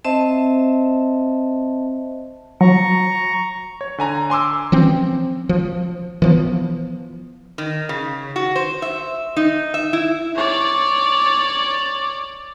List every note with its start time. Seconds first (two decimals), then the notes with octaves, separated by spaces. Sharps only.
0.05 C4 C5 D#5 E5 A5
2.61 F#3 A#5 C#6
3.81 C#5
3.98 D3 G#5 A#5
4.30 G#5 C6 D6 E6
4.72 E3 F3 C4 C#4
5.49 F3
6.22 E3 F3 B3
7.58 D#3
7.89 C#3
8.36 F#4
8.56 C5
8.82 E5
9.36 D#4
9.74 E5
9.93 E4
10.35 C#5 D5